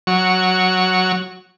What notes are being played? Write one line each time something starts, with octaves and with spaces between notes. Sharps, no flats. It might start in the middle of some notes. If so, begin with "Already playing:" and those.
F#3 C#6